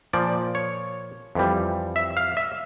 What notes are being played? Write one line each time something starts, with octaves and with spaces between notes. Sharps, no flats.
A#2 F3 D5
C#5
F2 E3 G3
E5
F5
E5